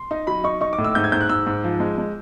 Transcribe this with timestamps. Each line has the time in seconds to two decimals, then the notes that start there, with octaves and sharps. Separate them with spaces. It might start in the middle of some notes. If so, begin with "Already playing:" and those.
Already playing: C6
0.11 D#4
0.27 F#3 B5
0.44 D#4 C#6
0.61 D#4 C#6
0.73 D6
0.78 A2
0.84 E6
0.95 G#2 G6
1.04 G#6
1.12 G#2 G6
1.21 F#6
1.29 G#2 E6
1.46 G#2
1.64 F3
1.80 G#3
1.98 G#3